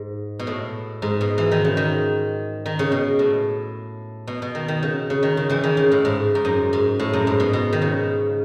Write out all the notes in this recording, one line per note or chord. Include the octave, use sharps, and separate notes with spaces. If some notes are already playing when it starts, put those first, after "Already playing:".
Already playing: G#2
B2
A2
G#2
B2
E3
D#3
C#3
D#3
D#3
C#3
B2
A2
B2
B2
D#3
D#3
C#3
C#3
D#3
C#3
C#3 E3
D#3
C#3
A2
G#2
G#2
F#2
G#2
A2
F#2
G#2
B2
B2
D#3
C#3